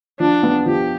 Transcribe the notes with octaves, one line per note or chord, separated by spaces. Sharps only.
F3 D4
B3
F3 G4